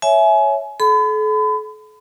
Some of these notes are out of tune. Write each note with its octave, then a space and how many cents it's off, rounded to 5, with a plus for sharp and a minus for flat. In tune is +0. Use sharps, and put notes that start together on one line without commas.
C#5 +0 E5 +0 G#5 +30
A4 -45 B5 +35